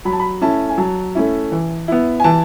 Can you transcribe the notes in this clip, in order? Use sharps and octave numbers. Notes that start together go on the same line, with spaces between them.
F#3 B5
A5
B5
A3 C#4 E4 A5
G#5
F#3 A5
A3 C#4 E4
E3
B3 E4
G#5
E3 A5